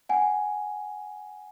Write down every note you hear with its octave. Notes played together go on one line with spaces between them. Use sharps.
F#5 G#5